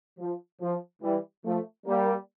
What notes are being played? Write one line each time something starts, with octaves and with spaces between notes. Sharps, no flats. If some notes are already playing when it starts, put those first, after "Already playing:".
F3
F3
E3 G3
F3 A3
G3 A#3